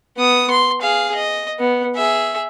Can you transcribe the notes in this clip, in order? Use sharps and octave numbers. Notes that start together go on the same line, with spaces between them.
B3 D#6
C6
G#4 F5
D#5
B3
G#4 E5